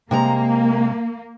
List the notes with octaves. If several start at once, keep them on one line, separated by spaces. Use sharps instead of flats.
C3 G#3 A#3 A#5